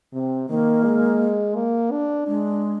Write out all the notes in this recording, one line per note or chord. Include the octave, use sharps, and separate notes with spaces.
C3 C4
D#3 A#3
G#3
A#3
D4
G#3 D4